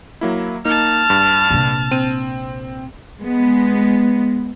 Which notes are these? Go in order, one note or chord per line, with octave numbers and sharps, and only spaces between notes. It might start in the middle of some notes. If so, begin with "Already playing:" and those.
F#3 A#3 E4
A#3 D#4 A5 F6
G2
A#1 C3
C4 D#7
G#3 B3